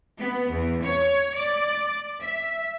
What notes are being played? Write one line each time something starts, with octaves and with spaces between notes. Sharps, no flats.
B3
E2
C#5
D5
E5